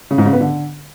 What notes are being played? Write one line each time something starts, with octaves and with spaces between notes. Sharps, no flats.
C#3
G#2
C#3
B3
D3